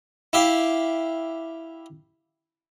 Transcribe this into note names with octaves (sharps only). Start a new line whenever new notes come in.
E4 G4 F5